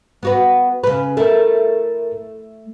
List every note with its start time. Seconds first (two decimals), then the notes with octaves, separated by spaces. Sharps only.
0.23 B3 F#4 B4
0.83 C#3 B4
1.17 A3 E4 A4 A#4